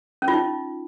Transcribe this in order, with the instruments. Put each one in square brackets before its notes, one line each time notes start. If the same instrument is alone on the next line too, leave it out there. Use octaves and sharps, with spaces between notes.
[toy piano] C#4
F4
D#4